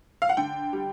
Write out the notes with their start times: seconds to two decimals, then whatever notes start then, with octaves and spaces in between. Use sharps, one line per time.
0.22 F5
0.29 F#5
0.37 D3 G5
0.73 G3